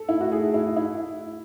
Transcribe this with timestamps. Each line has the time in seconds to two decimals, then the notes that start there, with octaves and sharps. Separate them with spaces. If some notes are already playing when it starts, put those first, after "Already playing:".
Already playing: A4
0.09 E4
0.20 F#4
0.32 G#4
0.54 E4
0.77 E4